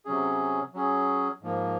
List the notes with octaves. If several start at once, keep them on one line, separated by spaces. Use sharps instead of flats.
C3 F#3 C#4 G#4
F#3 C#4 G#4
G#2 F3 A#3